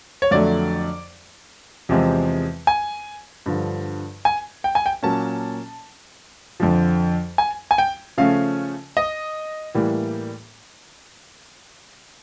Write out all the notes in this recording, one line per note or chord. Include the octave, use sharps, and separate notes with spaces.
C#5
F2 D3 F#3 A3 D5
E2 C3 F3 G#3 C4
G#5
G2 D3 F3
G#5
G5
G#5
G5
A#2 F#3 A#3 C#4 A5
F2 D3 F3
G#5
G#5
G5
C#3 F3 A3 C#4 F5
D#5
A2 E3 G3 A#3